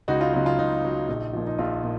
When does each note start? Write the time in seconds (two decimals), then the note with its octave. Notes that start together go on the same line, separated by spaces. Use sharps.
0.08 C#2 D#4 F#4
0.21 F4
0.33 C#3 F#3 D#4
0.46 F4
0.59 C#2 D#4
0.83 C#3 F#3
1.09 A#1
1.33 A#2 F3
1.47 D#4
1.58 A#1 F4
1.84 A#2